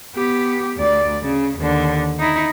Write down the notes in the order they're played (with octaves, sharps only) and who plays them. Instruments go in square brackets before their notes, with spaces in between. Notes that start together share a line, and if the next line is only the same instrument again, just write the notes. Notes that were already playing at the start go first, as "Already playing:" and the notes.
[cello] B3 G4
D2 D5
C#3
D#2 D3
D#4 E4